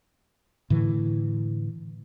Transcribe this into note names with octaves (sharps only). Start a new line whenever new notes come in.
A2 D3 E3